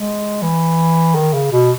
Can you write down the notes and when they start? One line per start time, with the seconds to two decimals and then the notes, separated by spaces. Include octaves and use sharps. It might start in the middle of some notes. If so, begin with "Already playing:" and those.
Already playing: G#3
0.42 E3
1.15 D#3
1.33 C#3
1.52 B2